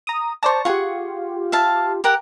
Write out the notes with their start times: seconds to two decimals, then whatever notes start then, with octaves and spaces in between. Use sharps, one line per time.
0.07 A#5 D#6
0.43 C5 D5 A5 A#5 C#6
0.65 F4 G4 G#4 F#5 C#6
1.52 E5 F5 A5
2.04 G4 A#4 F#5